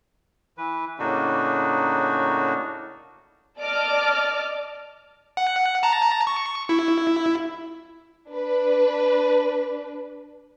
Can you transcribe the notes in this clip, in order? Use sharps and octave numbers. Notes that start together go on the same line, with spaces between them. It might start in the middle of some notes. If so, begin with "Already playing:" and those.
E3 B4
A2 C#3 A#3 D4 D#4 F#4
D5 D#5 A5 D6 F6
F#5
A5 A#5
C#6
E4
D4 B4